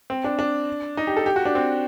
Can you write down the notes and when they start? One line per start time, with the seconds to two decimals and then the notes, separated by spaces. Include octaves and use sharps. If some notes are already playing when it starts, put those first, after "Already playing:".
0.10 C4
0.24 D4
0.39 D4
0.97 D#4
1.07 G4
1.17 A4
1.26 G4
1.36 F#4
1.45 D4
1.55 C4